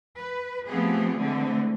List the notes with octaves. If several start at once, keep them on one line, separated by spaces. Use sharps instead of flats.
B4
F3 A3 B3 C4 G4 G#4
D3 E3 G#3 A3 C4